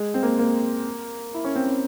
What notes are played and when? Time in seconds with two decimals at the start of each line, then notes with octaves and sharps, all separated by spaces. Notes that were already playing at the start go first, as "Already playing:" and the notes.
Already playing: G#3
0.14 C4
0.23 A#3
0.39 A#3
1.34 E4
1.44 C#4
1.55 C4
1.66 C#4